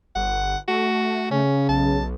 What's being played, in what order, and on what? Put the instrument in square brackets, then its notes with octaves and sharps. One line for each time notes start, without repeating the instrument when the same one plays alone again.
[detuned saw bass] G1 [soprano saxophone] F#5
[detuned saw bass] A3 [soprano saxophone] F#4
[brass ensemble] C#3 [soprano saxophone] C#4
[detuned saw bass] B1 [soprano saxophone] A5